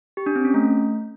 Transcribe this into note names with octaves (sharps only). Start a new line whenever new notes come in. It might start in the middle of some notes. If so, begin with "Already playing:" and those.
G4
D4
C4
C#4
A3